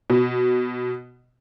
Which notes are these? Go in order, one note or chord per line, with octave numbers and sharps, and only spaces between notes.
B2